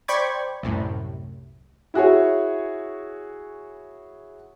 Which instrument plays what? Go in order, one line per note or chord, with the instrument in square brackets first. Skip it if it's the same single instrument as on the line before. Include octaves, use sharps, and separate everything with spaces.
[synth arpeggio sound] C5 D5 G5 B5 C#6 G#6
C2 F#2 A2
[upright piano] E4 F#4 G#4 C#5